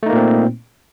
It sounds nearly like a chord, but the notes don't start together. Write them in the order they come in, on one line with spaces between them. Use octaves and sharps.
A3 D#4 A#3 A#2 C4